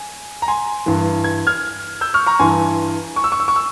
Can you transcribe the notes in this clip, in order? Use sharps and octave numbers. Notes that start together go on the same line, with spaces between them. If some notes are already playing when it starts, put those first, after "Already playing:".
Already playing: G#5
A#5
G#5 C6
G2 E3
G#6
F6 G#6
E6 G6
C#6 F6
A#5 C#6
G2 E3 G#5 C6
C#6
E6
C#6
E6
C#6
E6